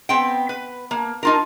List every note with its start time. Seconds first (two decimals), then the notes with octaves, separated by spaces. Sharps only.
0.09 B3 C4 G5
0.49 B4
0.91 A#3
1.23 D#4 F4 A#4